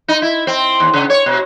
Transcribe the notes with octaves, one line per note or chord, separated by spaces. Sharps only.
D#4
E4
C4
D#2
C#3
C#5
B2